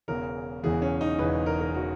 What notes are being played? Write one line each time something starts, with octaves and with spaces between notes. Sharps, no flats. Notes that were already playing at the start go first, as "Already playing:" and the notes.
E1 E2 C#3 E3 A#4
E1 E2 C#3 E3 G#4
C#4
D#4
E1 E2 C#3 E3 B4
A#4
A#4
C#3 E3 F#4